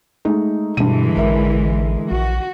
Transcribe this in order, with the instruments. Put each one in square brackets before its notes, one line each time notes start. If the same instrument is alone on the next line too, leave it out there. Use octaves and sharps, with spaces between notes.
[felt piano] G#3 A3 D#4
[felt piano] G2 D#7 [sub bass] B2 [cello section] D3 E3 G#3
[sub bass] A1 [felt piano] A#4 E5
[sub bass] A#1 [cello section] F#4